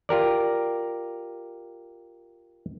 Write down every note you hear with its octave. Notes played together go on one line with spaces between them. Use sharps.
F4 G4 A#4 D5